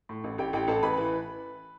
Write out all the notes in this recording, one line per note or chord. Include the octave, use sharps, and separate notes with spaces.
A2
A1
A1 G4 G5
A1 G4 G5
A1 A4 A5
A1 B4 B5
E3